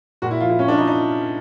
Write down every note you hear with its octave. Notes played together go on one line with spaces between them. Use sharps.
A#2 F#4
E4
F3 F4
E4
A#2 C#4
D4
F3 D#4
D#4